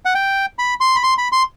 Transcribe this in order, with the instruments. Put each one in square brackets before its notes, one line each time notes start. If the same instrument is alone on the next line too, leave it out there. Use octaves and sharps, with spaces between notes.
[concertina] F#5
G5
B5
C6
B5
C6
B5
C6